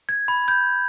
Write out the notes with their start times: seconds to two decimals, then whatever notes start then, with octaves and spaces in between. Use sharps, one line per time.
0.09 G#6
0.28 B5
0.48 G6